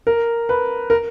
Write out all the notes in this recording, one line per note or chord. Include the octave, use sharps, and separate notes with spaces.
A#4
B4
A#4